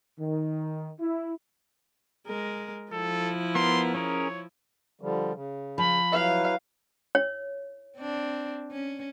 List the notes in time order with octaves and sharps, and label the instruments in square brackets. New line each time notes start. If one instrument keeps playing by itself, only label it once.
[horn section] D#3
E4
[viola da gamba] G#3 A#4
[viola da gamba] F3 E4 [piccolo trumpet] A4
[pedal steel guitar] B3 A#4 [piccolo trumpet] C6
[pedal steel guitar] C#4 G#4 A#4 [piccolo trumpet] C#5
[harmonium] D3 F3 G3
C#3
[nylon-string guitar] F3 [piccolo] B5
[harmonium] F#3 E4 B4 [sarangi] F5
[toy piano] C#5
[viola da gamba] C4 D4
C#4